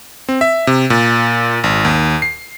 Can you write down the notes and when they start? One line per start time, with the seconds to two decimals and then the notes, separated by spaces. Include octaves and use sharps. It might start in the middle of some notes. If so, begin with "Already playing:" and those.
0.29 C4
0.41 E5
0.67 C3
0.90 A#2
1.64 G#1
1.85 D#2
2.22 C7